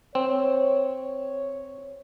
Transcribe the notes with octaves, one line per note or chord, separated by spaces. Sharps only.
C4 C#5